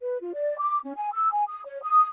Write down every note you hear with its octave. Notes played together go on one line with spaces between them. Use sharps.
B4
F4
D5
D6
C#4
G#5
E6
G#5
D#6
C#5
D#6